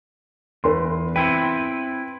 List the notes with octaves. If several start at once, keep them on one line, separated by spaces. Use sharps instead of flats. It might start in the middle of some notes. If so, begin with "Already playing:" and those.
E2 B4 C6
C4 E4 B4 G5